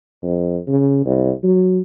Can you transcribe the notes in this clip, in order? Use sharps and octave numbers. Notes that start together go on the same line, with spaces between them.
F2
C#3
C2
F#3